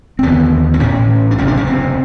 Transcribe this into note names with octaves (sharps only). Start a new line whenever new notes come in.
C4
F1 D#2 D3 B3
C4
A1 A2 C#4
D4
F#1 E2 C3 C#4
D4
C#4
C4